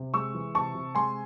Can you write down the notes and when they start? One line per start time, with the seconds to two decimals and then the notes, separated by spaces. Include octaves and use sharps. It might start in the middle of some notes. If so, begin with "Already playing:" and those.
Already playing: C3
0.14 G#3 C#6 E6
0.34 E3
0.55 C3 A5 C#6
0.75 C3
0.95 G#3 G#5 C6